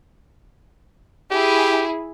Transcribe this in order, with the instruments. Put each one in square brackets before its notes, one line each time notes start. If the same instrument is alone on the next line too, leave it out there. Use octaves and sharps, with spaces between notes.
[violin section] E4 G#4 [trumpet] G4